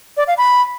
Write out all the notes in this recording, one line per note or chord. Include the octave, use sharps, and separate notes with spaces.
D5
F5
B5